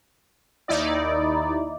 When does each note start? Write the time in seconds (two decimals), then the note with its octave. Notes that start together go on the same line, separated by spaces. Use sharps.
0.68 D#2 D#4 E4 D5